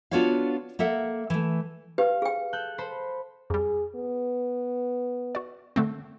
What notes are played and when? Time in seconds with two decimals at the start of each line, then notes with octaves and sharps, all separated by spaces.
0.11 B3 D4 F4 F#4 C#5 F5
0.79 A#3 A4 E5 F#5
1.30 E3 A3
1.98 G4 B4 F5
2.22 G#4 G5
2.53 A4 F#6 G6
2.78 A4 C5 B5
3.50 F2 G3 G#4
3.95 B3
5.35 F#4 D5
5.76 D3 A3 C4